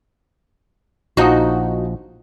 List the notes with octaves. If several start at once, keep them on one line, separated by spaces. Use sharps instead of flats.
A#1 F3 D#4 F#4 D#5